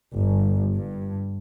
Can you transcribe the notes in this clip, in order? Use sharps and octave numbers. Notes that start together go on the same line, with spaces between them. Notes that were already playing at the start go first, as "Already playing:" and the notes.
G1
G2